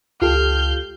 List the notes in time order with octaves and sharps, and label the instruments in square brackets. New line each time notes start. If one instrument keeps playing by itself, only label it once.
[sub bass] C#2 [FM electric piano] F4 G4 A4 [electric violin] F6 G6